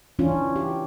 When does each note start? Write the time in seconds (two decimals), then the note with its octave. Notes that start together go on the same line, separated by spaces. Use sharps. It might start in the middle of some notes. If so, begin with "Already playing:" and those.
0.19 E3 C#4 D4 F4
0.56 G4